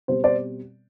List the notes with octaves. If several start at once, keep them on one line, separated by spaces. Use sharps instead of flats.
B2 G3 C4 C5
C5 D5